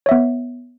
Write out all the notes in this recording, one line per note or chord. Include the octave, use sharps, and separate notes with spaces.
B3 C#5 E5